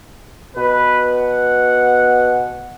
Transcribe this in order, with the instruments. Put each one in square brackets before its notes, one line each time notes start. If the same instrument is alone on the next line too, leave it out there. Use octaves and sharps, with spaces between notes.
[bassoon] B2 [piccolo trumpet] B4
[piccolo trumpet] F#5